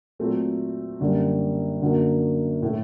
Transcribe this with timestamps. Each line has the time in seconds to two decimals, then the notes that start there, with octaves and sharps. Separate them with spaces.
0.19 A#2 F#3 A3 C4
1.00 F#2 D3 G3 A#3
1.81 F#2 D3 F#3 A#3
2.63 A2 A3